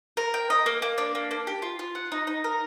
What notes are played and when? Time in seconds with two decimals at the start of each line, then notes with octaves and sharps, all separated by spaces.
0.17 A#4
0.34 G5
0.50 D#5
0.66 A#3
0.82 A#3
0.98 D4
1.15 A#3
1.31 A#3
1.47 G4
1.62 F4
1.79 F4
1.95 F#5
2.12 D#4
2.27 D#4
2.44 A#4